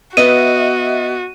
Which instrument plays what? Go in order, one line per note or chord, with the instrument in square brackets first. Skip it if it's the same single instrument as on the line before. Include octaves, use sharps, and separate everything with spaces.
[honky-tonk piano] B3 [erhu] F#4 [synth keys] D#5 E5 [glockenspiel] D#7